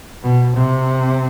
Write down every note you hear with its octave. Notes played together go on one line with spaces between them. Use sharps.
B2
C3